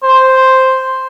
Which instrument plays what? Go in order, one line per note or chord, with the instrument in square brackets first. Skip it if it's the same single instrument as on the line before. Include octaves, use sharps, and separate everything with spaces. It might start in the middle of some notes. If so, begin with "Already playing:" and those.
[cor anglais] C5